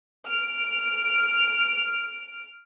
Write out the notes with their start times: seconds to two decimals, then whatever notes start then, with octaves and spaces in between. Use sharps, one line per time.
0.27 F6 D7